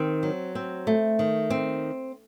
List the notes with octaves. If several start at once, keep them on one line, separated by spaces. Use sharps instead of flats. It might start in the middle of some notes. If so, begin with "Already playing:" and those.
Already playing: D#3 C4
F#3
C4
A3
D#3
C4